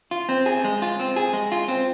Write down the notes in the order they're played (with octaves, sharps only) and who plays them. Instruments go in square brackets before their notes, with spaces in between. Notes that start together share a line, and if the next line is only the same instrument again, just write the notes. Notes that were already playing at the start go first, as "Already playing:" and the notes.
[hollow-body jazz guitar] F4
C4
G#4
G#3
F4
C4
G#4
G#3
F4
C4